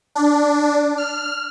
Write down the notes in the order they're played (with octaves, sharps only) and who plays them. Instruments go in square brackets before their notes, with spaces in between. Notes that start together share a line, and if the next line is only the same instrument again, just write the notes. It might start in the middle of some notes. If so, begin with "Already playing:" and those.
[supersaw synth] D4
F6